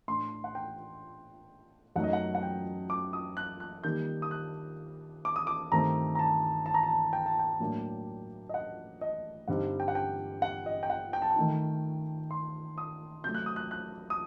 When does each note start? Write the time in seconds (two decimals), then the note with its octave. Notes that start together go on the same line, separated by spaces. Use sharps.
0.08 A2 A3 D4 C6
0.44 F#5
0.55 G5
1.96 F#2 F#3 A3 D#4 F#5
2.04 D#5
2.13 F#5
2.35 F#5
2.43 G5
2.90 D6
3.13 D#6
3.37 F#6
3.60 F#6
3.84 D#3 G3 A#3 D#4 G6
4.22 D#6
4.31 F#6
5.25 D6
5.36 D#6
5.47 D6
5.72 G2 D#3 A3 C4 A#5
6.15 A#5
6.19 A5
6.66 A5
6.74 A#5
6.83 A5
7.13 G5
7.26 A5
7.39 G5
7.60 A2 F#3 A#3 D4
8.49 D#5
8.54 F#5
9.01 D#5
9.48 G2 D3 G3 C4 D#4 F#5
9.80 G5
9.88 F#5
9.95 G5
10.42 F#5
10.66 D#5
10.83 G5
10.90 F#5
11.13 G5
11.22 A5
11.31 G5
11.36 D#3 A3 D#4
12.31 C6
12.78 D#6
13.24 C3 F#3 A3 G6
13.34 F#6
13.46 D#6
13.56 F#6
13.71 F#6
14.10 D#6